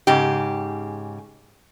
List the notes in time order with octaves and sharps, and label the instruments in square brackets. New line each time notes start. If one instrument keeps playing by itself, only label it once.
[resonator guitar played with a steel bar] G#2 C#3 G4